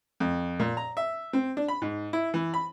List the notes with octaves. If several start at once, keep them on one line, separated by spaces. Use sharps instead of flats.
F2
A#2
A#5
E5
C4
D4
B5
G#2
E4
E3
B5